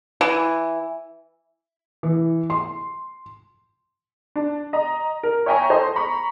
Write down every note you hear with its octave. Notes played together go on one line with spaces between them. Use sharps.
E3
E3
C6
D4
D#5 A#5
A#4
C#5 E5 G5 G#5 A#5 C#6
A4 C5 D#5 C6
A#5 B5 C#6